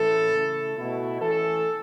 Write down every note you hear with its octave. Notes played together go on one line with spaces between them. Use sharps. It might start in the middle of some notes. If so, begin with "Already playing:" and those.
Already playing: A2 E3 C#4 E4 A4
C#3 A3 E4
B2 A3 E4
E3 A3 C#4 A4